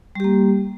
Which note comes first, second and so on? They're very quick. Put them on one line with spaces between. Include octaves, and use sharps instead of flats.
G3 G4 A#3